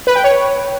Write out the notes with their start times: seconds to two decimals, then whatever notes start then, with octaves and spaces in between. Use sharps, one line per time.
0.07 B4
0.15 G5
0.24 C#5